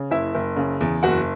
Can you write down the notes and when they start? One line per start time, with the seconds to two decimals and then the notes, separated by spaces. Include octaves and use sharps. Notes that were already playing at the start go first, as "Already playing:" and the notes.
Already playing: C#3
0.11 F#1 E4 E5
0.35 F#1
0.56 C#3
0.81 E2
1.03 F#1 F#4 F#5